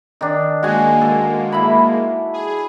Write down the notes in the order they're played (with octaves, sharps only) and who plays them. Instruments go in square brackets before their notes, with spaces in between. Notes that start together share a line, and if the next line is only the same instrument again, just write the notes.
[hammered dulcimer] D#3 D4
[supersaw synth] G#3 A#3 [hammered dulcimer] F#4 G#5
[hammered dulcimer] A4
E4 B5
[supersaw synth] G#4